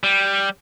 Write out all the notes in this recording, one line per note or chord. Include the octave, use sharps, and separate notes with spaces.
G3